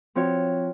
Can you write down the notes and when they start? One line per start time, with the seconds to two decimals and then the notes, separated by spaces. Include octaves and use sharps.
0.15 F3 C4 F#4 C#5